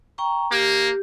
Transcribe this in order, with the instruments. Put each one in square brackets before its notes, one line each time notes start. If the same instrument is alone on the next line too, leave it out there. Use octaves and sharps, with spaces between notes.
[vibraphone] G5 A#5 C#6
[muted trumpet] A#3 [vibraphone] G4